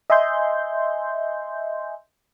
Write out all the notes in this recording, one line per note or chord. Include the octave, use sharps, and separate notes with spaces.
D#5 E5 G#5 C6 G6